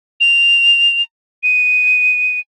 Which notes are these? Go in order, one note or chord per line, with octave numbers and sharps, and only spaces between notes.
F7
D#7